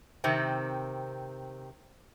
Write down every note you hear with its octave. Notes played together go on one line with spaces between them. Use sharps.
C3 D#3 C4